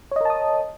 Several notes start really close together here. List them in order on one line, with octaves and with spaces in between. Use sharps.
C#5 D#5 A#4 A5 D#6